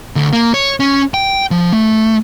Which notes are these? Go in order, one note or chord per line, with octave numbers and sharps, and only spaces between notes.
D2
A#3
C#5
C#4
G5
F3
A3